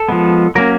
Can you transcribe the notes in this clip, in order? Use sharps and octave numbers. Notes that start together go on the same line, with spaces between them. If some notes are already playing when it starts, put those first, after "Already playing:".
Already playing: A4
F3 G#3 B3
F#3 A#3 C#4 A#4